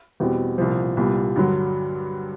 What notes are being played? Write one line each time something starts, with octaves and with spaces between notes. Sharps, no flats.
E2 B2 G3 C4
C2 A#2 F3
C2 A#2 G3 B3
G2 D3 F#3